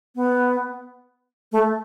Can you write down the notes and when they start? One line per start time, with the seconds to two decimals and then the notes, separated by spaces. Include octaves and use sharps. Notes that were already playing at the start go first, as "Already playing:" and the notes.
0.15 B3
1.52 A3